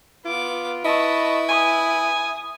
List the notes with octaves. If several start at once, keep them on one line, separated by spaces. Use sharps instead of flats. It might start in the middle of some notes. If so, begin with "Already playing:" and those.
B3 F4 D6
E4 B4 D#5 A5 C#6
G#5 D#6